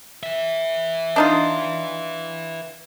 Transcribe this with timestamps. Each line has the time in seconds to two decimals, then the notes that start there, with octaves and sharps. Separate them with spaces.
0.23 B4 E5
1.16 D4 D#4 F4